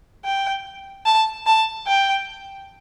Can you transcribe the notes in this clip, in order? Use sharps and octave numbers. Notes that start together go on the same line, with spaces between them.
G5
A5
A5
G5